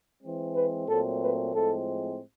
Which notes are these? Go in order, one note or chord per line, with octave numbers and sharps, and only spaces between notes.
E3 G#3 C4
B4
A#2 F#3 A3 C4 A4
B4
A2 F3 G#3 C4 A4